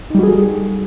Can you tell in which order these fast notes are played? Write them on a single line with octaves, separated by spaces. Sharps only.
D#4 G3 F#4 G#4 A4